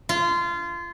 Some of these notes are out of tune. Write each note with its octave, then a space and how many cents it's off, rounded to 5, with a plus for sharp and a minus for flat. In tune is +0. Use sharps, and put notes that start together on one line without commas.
F4 -25